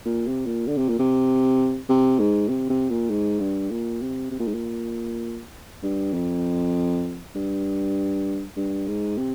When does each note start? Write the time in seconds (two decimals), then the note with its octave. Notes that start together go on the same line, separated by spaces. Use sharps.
0.05 A#2
0.27 C3
0.46 A#2
0.67 D3
0.77 C3
0.88 A#2
0.99 C3
1.89 C3
2.19 G#2
2.49 C3
2.70 C3
2.90 A#2
3.10 G#2
3.40 G2
3.71 A#2
4.01 C3
4.31 C3
4.39 A#2
4.47 G#2
4.54 A#2
5.83 G2
6.13 F2
7.35 G2
8.57 G2
8.88 G#2
9.18 C3